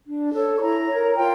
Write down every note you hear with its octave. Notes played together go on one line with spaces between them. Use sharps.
D4
A4 C#5
C#6
E4 A#5
A#4 C#5
F4 G5